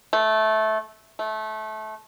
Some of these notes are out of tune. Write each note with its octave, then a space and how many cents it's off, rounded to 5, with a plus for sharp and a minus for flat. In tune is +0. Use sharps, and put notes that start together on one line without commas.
A3 -15
A3 -20